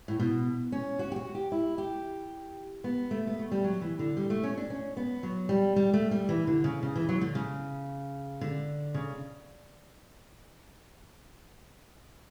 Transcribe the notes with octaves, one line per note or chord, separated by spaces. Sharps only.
A2
B2
C#4
F#4
G4
F#4
G4
E4
G4
B3
A3
B3
A3
G3
F#3
E3
D3
G3
A3
C#4
D4
C#4
B3
F#3
G3
G3
A3
G3
E3
D3
C#3
C#3
E3
F#3
D3
C#3
D3
C#3